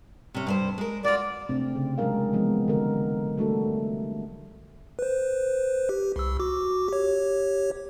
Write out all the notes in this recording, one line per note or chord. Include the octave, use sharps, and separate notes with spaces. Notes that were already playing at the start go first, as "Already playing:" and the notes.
C3 C#4
G2 A#4 C5
G#3 A#4
F4 F#4 D5
C3 A3 C4 D4
C#3
F#3 G#3 D4 G#4 A#4 F5
E3 F3 G#3 B3 C#4
D3 F3 F#4 A#4
G3 A3 D4 F#4 A4
B4 C5
G4
C2 E6
F#4 D6
G4 C#5